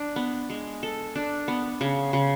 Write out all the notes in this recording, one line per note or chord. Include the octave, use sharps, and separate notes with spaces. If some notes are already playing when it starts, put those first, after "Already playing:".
Already playing: D4
B3
G#3
A4
D4
B3
C#3
C#3